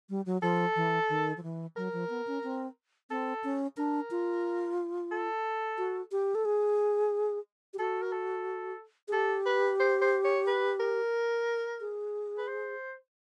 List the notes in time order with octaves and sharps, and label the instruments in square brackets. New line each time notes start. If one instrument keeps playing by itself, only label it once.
[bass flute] G3
F#3
[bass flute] F3 [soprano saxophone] A4
[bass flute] E3
D#3
F3
E3
[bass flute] F#3 [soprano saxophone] A#4
[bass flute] F3
B3
C#4
C4
[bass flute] C4 [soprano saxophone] A4
[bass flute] C#4
[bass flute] D4 [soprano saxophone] A#4
[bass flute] F4
[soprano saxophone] A4
[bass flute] F#4
G4
A4
G#4
G4
[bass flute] F#4 [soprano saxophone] A4
[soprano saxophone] A#4
A4
[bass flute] G#4
[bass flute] G4 [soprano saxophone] A4
[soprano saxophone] B4
C5
C5
C#5
B4
A#4
[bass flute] G#4
[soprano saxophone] B4
C5